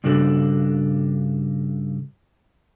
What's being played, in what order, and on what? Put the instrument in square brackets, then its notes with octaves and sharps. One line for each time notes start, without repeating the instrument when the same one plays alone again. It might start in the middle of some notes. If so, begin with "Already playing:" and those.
[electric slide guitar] G2 C#3 D4 F#4 A4